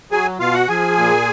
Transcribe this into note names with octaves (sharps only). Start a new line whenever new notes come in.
F#3 G#4 G#5
B2 F4 F5
F#4 F#5
F3 G#4 G#5
A#2